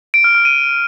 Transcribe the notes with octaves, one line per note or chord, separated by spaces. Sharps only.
D7
F6
F6
D#7